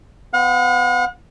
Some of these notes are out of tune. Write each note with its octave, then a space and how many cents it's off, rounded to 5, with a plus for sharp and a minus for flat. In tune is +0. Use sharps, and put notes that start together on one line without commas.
B3 +35 F#5 -45